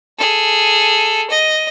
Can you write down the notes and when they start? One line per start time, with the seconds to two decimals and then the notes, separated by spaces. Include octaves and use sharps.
0.18 G#4 A4
1.30 D#5